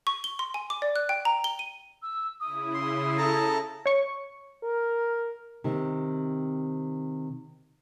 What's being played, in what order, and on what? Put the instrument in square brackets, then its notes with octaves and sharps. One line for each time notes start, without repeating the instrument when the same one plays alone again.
[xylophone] C#6
G7
C6
G#5
D6
D5
F#6
G5
A#5
G7
D#7
[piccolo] E6
[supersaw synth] C#3 E4 [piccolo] D#6
[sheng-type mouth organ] C6
A4 A5 A#5
[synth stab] C#5 C#6
[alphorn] A#4
[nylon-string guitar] C3 D#3 C4